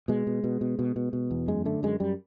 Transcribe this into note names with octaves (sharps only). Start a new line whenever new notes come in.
B2 G#3
B2
B2
B2
B2
B2
B2
E2
F#2 G#3
D3 A3
F#2 G#3
F#2 G3